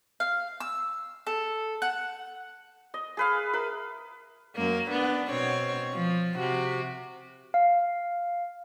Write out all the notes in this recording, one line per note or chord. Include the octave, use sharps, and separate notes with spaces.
F5
E6
A4
F#5
D#5
G#4 B4 F5
A#4 B4 E5
F#2 A#3
B3 D4
B2 C4 C#5
F3
C3 F#4
F5